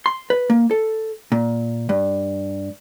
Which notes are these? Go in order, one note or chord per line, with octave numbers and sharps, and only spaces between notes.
C6
B4
A#3
A4
A#2
G2